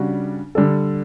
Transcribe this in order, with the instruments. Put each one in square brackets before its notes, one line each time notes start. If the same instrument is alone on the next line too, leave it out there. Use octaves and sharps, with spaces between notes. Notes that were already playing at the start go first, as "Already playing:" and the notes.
Already playing: [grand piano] C#3 G3 D4 F#4
D3 G3 D4 A4